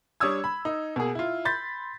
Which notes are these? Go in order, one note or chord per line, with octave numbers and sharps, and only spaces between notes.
G3 D4 C#5 D#6 E6 G#6
B5
D#4
B2 A#3 G#4
E4 F4
B5 C6 G6 A6 B6